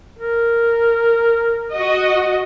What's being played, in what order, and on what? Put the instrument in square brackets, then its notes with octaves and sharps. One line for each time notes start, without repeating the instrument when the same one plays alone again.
[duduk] A#4
[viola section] F#4 D#5